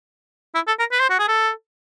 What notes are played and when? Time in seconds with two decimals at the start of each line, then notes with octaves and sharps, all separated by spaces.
0.54 E4
0.67 A4
0.79 A#4
0.91 B4
1.00 C5
1.09 F#4
1.19 G#4
1.28 A4